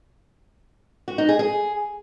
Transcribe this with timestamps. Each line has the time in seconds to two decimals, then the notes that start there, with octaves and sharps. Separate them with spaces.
1.08 F#4
1.18 D#4
1.29 G#4
1.39 G#4